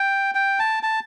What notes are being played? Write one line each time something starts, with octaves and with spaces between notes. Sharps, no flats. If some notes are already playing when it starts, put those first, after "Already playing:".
Already playing: G5
G5
A5
A5